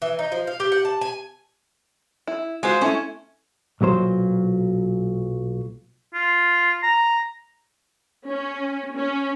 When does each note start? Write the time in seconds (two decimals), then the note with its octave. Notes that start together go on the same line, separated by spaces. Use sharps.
0.02 E3
0.19 D#4
0.32 F3
0.47 F5
0.60 G4
0.72 F#5
0.85 A5
1.01 G#5
2.27 E4
2.63 G#3 F4 F#4 C5
2.81 A3 C#4 E4
3.81 B1 A#2 F#3 C5
6.14 F4
6.83 A#5
8.27 C#4
8.95 C#4